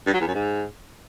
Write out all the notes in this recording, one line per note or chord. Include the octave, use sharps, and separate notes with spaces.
G2
F#3
E2
F#2
G#2